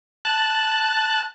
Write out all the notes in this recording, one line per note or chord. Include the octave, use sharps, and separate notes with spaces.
A5 F#6